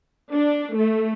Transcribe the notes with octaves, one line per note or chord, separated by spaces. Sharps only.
D4
A3